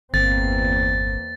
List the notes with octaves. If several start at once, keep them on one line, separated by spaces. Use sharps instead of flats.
G1 E2 A#3 C4 A6